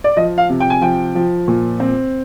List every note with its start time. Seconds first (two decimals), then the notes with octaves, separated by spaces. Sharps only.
0.04 D5
0.17 F3 D#5
0.38 F5
0.50 C3
0.60 G5
0.70 G#5
0.81 F3 G5
1.15 F3
1.48 A#2
1.80 C4